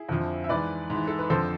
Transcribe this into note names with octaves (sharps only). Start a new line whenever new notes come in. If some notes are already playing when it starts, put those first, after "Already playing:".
Already playing: E4 G#4
F2 D3 F3
E5
G#2 E3 B4 D5
G#2 E3
A4
B4
F2 D3 F3 A4 C5